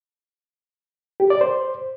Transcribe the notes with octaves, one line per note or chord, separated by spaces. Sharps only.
G4
D5
C5